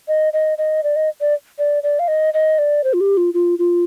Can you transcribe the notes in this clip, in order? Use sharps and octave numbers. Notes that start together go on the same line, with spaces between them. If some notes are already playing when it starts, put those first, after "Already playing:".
D#5
D#5
D#5
D5
D#5
D5
D5
D5
F5
D#5
D#5
D5
C5
F4
G4
F4
F4
F4